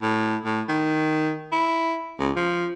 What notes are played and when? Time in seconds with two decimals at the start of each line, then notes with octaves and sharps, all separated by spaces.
0.02 A2
0.45 A2
0.69 D#3
1.52 E4
2.19 C#2
2.36 F3